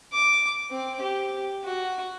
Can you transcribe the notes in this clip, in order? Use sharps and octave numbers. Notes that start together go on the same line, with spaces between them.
D6
C4
G4
F#4